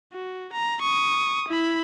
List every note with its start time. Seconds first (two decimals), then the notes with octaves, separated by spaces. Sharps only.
0.13 F#4
0.53 A#5
0.82 C#6 D#6
1.49 E4 B5